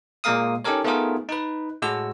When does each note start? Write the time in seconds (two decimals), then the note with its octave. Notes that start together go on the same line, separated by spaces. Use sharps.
0.24 A#2 G#3 A#3 A#4 F5 D#6
0.64 C#4 D#4 G4 A4 A#4 C#5
0.84 A3 B3 D#4 F4 G#4 A#4
1.28 D#4 B4
1.82 A2 G#3 F#4 E6